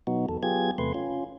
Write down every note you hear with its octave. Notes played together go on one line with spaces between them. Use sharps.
B2 F#3 B3 D#4 F#4
E2 A4
F#3 B3 F4 G4 G#4 G#6
E2 C3 A3 B4 C6
C#4 F4